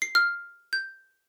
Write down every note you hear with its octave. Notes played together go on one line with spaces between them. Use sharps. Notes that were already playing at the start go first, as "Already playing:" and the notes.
C7
F6
G6